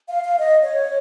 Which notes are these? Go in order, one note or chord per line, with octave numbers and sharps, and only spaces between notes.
F5
F5
D#5
C#5